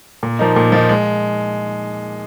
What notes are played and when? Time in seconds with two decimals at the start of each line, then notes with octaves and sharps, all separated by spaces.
0.23 A#2
0.39 F3 A#3 D#4
0.56 A#2
0.72 F3 A#3 D#4
0.89 G#3